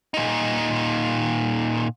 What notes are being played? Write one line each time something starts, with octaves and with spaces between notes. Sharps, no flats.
A#2 D#4